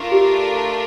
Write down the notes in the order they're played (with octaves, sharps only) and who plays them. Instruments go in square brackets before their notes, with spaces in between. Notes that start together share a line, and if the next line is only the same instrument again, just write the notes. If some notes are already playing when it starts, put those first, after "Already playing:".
Already playing: [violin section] A3 D4 F4 A#4
[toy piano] G4